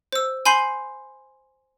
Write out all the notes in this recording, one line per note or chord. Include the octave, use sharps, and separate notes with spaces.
C5 E6
G#5 B5 C6 G6 C7